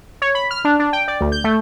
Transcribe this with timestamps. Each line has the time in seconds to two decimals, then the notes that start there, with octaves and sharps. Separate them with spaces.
0.22 C#5
0.35 B5
0.51 F6
0.65 D4
0.80 D4
0.93 G5
1.08 D5
1.21 D2
1.32 G6
1.44 A3